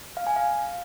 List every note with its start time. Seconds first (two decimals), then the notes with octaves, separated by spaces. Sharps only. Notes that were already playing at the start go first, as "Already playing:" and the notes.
0.17 F5
0.27 G#5
0.36 F5